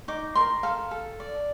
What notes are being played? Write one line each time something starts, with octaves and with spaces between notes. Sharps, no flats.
D#4 D6
A#4 C6
A4 F5
A4
D5